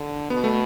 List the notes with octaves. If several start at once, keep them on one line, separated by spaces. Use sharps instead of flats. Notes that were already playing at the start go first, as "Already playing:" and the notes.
Already playing: D3
B2 B3
A3